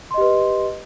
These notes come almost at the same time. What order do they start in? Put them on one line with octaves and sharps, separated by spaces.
C6 D#5 G4 B4